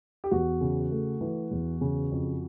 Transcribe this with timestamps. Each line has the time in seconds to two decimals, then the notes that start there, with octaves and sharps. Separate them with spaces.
0.24 G4
0.31 E2 F#4
0.61 C#3
0.91 A3
1.21 E3
1.51 E2
1.81 C#3
2.11 F2